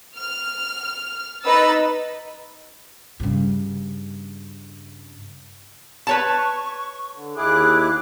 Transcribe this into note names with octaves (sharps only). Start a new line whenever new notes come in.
F6
D#4 B4 E6 A6
G2 C#3
B4 C#5 A5 C#6
D3
D#2 E4 G#4 D6 F#6